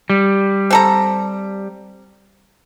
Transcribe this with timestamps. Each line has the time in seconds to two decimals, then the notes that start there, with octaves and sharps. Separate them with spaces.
0.10 G3
0.71 C4 A4 A#5